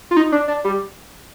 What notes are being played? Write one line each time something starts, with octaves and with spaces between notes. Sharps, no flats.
F4
D#4
D4
D4
G3